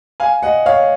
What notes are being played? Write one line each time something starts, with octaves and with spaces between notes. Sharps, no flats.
F5 G#5
D#5 F#5
C#5 F5